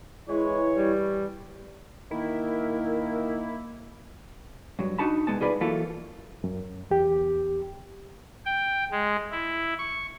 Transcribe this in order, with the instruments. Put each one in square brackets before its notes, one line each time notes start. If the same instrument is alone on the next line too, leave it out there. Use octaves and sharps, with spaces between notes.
[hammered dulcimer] E3 [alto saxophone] G#3 [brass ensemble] E4 C#5
[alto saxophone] G3
[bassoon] D#3 [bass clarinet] A#3 [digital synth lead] E4 [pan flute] A#4
[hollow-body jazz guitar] G2 F#3
D4 D#4 F#4 A5 B5
C2 G#3 B3 A5
C2 D#4 F4 G#4 B4 D5
E3 F#3 A#3 E4 F4 A4
[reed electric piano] F#2
E2 G4
[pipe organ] G5
G#3
E4
C#6